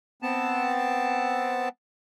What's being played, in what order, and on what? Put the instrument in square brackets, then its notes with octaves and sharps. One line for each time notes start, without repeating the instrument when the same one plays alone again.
[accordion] B3 C4 A5